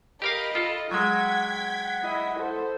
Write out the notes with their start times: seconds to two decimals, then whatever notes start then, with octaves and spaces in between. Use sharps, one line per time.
0.22 G4 A#4 D#5 F5 B5
0.55 F4 A4
0.91 F#3 G#3 F#5 G5 G#6 B6
1.53 F#5
2.03 E4 D#5
2.39 A4 C5